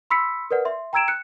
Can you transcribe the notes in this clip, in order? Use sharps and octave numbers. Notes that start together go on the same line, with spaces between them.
B5 C6 E6 B6 C#7
A#4 B4 D5 F#5
E5 C6
G5 A#5 E6 G#6 D7 E7
F#6 C#7